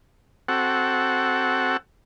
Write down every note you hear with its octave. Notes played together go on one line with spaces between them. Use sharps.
C4 F#4 A4 F#5